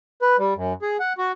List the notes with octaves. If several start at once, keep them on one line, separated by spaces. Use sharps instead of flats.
B4
G3
F#2
G#4
F#5
F#4